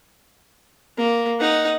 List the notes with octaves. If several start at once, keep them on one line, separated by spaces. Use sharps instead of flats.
A#3
D#4 F#5